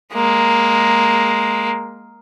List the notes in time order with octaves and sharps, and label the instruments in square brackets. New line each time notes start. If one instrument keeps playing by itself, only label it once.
[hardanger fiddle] G#3 A#3